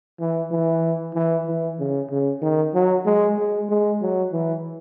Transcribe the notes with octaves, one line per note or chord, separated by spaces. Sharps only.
E3
E3
E3
E3
C#3
C#3
D#3
F#3
G#3
G#3
G#3
F#3
E3